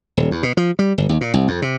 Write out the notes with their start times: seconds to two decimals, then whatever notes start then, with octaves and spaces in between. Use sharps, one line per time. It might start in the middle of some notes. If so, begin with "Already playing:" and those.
0.17 D#1
0.31 E2
0.43 B2
0.57 F3
0.79 G3
0.98 G1
1.09 D#2
1.21 A#2
1.34 C2
1.48 F2
1.62 C3